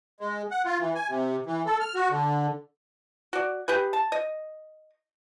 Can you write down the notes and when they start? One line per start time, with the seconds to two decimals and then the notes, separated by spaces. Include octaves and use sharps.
0.21 G#3
0.51 F#5
0.65 F4
0.79 E3
0.95 G#5
1.09 C3
1.46 E3
1.66 A4
1.80 F6
1.95 F#4
2.10 D3
3.33 F#4 D5
3.68 G4 G#4 B4
3.93 A5
4.12 D#5